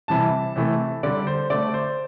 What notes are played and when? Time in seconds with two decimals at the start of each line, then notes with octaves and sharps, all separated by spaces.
0.08 C3 E3 G3 A5
0.56 C3 E3 A3
1.03 D3 G3 D5
1.27 C5
1.50 D3 A3 D5
1.74 C5